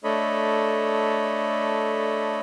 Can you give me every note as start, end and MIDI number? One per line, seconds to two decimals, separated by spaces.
0.04 2.41 57
0.04 2.41 62
0.04 2.41 69
0.04 2.41 73
0.04 2.41 75
0.04 2.41 83